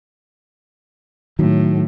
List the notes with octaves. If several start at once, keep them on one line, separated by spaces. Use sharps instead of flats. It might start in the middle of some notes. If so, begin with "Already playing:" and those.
A2 D#3 F#3